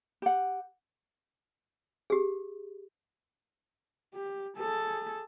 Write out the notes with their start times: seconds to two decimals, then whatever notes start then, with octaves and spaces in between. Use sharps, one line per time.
0.22 G4 F#5
2.10 G4 G#4
4.14 G4
4.57 G#4 A4